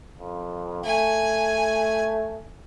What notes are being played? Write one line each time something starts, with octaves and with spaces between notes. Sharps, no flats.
F2
A3 G#5